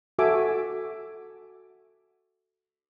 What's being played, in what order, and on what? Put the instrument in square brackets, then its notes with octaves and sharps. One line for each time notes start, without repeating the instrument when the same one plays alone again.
[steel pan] F#4 A4 E5 G#5 D6